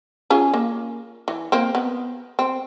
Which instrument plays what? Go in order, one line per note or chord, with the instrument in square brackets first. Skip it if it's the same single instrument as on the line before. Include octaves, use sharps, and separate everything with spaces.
[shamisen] C#4 F4 G#4
A#3
E3
A#3 C4
B3
C4